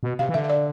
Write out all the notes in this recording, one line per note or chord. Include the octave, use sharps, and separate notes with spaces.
B2
C3 F5
E3
D3 E5
E5
D5